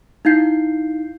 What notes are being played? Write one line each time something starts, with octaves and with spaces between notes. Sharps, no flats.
D#4 E4 F5 G6 C7